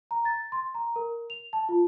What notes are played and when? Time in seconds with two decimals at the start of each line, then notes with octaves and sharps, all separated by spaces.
0.11 A#5
0.25 A6
0.52 C6
0.74 A#5
0.96 A#4
1.30 F7
1.53 A5
1.69 F4